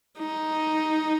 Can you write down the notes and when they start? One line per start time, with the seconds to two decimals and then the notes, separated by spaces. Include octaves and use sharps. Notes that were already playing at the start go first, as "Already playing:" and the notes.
0.18 D#4